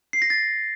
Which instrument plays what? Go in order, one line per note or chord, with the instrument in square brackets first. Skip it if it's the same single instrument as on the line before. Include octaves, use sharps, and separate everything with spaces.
[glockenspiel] C7
A#6
A6